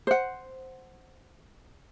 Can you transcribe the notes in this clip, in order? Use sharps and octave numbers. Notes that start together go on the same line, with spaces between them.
C5 F#5